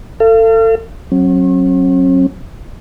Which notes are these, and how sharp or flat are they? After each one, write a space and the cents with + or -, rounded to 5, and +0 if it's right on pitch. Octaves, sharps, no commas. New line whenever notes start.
A4 +30 F5 -40
F#3 +0 C#4 -45